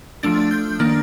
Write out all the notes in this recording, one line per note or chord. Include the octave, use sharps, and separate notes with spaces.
F3 A3 D4 A6
G6
D#3 A#3 D4 F6